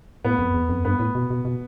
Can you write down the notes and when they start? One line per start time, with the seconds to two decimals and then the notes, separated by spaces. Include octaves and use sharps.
0.25 A2 B3
0.39 F2
0.54 E2
0.69 F2
0.85 G2 B3
1.00 A2
1.15 B2
1.30 B2
1.45 B2